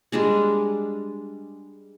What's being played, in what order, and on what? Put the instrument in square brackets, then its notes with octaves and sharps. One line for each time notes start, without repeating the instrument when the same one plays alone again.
[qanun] G3 G#3 D4 G#4